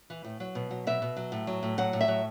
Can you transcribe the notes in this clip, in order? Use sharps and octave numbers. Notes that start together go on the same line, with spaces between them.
E3
A2
F#3
B2
F#3
B2 E5
B2
F#3
A2
F#3
A2
F#3 F#5
A2
E5
F#3